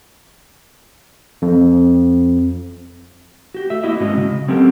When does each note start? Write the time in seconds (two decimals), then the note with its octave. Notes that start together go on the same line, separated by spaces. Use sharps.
1.42 F2
3.54 F#4 G4
3.70 A3 E5
3.84 A#3 E4 F#4 D#5
4.00 G#2 G#3 C#4 F#4 D#5
4.17 C#3
4.48 F#3 C4 C#4 G4 A4 A#4